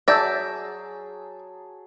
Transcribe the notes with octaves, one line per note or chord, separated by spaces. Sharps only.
F#3 G#4 D5 E5 A5 E6 G6 A#6